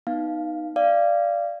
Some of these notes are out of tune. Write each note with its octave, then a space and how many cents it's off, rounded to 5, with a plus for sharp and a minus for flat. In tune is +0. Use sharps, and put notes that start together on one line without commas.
B3 +0 D#4 +0 F5 +0
D5 +0 F5 -20